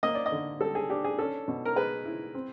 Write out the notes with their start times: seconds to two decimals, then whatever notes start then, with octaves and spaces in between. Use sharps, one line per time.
0.03 A#3 D#5
0.15 D5
0.26 D#5
0.32 D3
0.61 G3 A4
0.75 G#4
0.90 D4 G4
1.04 G#4
1.18 C#4 A4
1.48 B2
1.65 A#4
1.76 G#3 B4
2.05 E4
2.34 C4